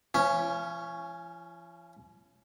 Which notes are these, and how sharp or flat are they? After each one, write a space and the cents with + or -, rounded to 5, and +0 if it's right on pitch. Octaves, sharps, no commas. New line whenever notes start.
F3 -45 C#4 +0